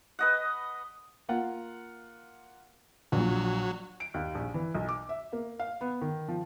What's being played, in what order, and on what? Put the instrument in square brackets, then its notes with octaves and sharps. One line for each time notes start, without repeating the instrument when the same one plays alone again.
[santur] B4 D#5 F#5
[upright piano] A#3 F4 F#5
[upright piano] A#1 A#2 [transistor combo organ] F#3
[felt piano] D7
D#2
A#1
E3
B1
D6
E5
A#3
F5
B3
D#3
F3